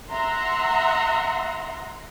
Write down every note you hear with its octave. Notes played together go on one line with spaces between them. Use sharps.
E5 F#5 A#5 C6